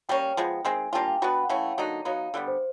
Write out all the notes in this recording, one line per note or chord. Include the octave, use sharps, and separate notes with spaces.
G3 A#3 C#4 G5
F3 G#3 B3
D#3 G#3 C4 G#5
G3 A#3 D4 F4 G5
G5
B3 D4 F#4 B4
F#5
E3 A3 C#4 F5
D3 F#3 A#3 D#4
F#3 B3 D#4 F5
D3 G3 B3
C5